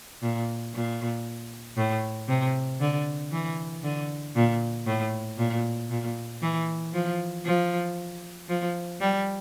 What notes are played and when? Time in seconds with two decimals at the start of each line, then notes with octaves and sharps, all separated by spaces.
0.22 A#2
0.74 A#2
1.77 A2
2.29 C3
2.81 D3
3.32 E3
3.84 D3
4.36 A#2
4.86 A2
5.38 A#2
5.90 A#2
6.42 E3
6.94 F3
7.45 F3
8.49 F3
9.00 G3